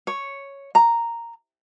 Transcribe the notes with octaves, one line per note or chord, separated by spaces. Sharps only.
C#5
A#5